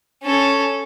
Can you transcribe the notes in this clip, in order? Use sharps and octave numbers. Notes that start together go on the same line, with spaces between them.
C#4 A4